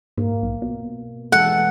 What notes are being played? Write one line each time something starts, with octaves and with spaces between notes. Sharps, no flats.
G#2 A#3
B1
B2
E3 G#3 A4 F#5